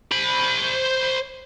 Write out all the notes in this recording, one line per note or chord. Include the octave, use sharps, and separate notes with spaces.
C5 B5